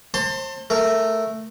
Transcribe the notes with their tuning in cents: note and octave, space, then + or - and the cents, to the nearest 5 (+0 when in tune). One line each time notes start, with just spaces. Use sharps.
C5 +35 A5 +35 C6 -5
A3 +0 A#4 -15